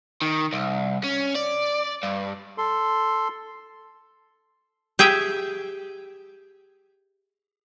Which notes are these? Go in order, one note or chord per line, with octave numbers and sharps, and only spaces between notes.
D#3
C2
C#4
D5
G2
A4 C6
G4 G#4 E5 G5